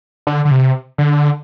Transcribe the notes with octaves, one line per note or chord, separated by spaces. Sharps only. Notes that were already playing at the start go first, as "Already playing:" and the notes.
D3
D3
C3
D3